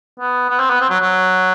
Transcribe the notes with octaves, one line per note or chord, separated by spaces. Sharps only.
B3
B3
C4
B3
C4
F#3
F#3